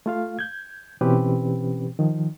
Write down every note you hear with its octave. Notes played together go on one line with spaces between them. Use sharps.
A3 F4 F5
G6 G#6
B2 E3 C4 C#4 G4 B4
D#3 F3